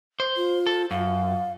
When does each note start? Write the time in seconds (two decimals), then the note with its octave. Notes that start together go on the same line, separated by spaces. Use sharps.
0.20 C5
0.37 F4
0.66 A4
0.91 F#2 F5